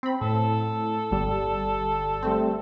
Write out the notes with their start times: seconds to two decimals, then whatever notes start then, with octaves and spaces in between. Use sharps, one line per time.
0.03 C4 B5
0.21 A2 A4
1.11 G1 G3
2.23 G3 A3 C4